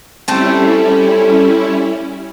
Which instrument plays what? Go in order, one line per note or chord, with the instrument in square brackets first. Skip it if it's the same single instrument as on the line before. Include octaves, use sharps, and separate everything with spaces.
[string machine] G3 C#4 E4 [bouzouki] A3 C4 A4